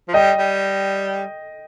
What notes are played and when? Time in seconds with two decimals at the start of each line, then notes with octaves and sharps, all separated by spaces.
0.09 F3
0.14 G3 D#5 G5
0.38 G3